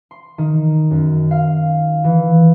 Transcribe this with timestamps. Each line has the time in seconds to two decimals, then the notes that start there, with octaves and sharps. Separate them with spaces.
0.11 C6
0.38 D#3
0.91 F#2
1.31 F5
2.04 E3